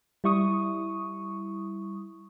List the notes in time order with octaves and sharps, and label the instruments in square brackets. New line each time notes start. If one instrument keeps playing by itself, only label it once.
[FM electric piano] G3 E4 C#6 D#6